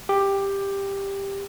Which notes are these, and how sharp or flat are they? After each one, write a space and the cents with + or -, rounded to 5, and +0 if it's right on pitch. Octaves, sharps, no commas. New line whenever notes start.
G4 +10